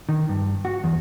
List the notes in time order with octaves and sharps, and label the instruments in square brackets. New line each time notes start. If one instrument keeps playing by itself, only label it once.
[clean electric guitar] D#3
G2
F#4
E2